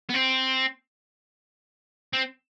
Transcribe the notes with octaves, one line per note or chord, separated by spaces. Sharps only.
B3
C4
C4